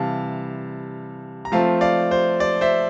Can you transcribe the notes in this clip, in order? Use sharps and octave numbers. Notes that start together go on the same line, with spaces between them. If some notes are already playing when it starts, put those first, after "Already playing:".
Already playing: C3 E3 G3 F5 A5
A#5
F3 A3 C4 F4 F5 A5
D5 F5
C5
D5
C5 E5